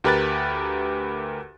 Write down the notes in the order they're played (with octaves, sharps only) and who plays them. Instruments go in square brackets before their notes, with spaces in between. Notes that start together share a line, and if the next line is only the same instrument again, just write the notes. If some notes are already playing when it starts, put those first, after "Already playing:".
[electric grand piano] D2 G4 A#4 B4 F#6 A6